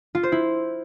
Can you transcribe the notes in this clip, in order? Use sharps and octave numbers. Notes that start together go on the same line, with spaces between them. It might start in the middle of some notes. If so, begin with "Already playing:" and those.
F4
C5
E4